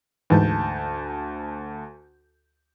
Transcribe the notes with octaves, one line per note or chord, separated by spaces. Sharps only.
D2 G#2 E3 A5 G6